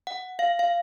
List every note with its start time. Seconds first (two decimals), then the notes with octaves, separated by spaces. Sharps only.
0.07 F#5
0.39 F5
0.59 F5